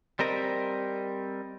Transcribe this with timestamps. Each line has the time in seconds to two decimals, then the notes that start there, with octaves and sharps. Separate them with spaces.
0.19 G3 C4 A#4 D#5